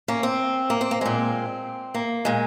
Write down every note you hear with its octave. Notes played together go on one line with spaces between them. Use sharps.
A#3 C#4
C4
A#3
C4
A#3
A#2 G#3 C4
A#3
A#2 G#3